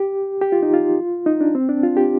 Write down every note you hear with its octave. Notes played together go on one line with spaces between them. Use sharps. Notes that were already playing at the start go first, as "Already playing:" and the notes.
Already playing: G4
G4
F4
D#4
F4
D#4
D4
C4
D4
F4
G4